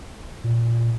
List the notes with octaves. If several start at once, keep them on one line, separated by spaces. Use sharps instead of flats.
A#2